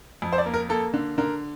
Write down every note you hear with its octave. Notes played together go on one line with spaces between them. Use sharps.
F2
C5
D5
A#3
A#4
A#3 A4
D3
D3 A#4